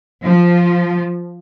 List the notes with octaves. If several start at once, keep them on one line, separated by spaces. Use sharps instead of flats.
F3